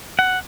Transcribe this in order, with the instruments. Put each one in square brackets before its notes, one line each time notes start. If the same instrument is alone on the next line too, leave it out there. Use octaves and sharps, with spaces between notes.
[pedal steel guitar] F#5